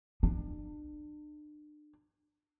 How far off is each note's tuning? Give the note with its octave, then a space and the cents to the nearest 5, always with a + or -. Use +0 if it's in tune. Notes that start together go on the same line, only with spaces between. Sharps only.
D4 +35